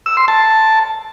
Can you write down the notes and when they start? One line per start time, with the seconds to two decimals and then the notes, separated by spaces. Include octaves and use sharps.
0.06 E6
0.17 C6
0.28 A5